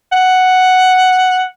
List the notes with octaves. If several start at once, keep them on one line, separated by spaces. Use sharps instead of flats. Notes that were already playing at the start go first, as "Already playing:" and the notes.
F#5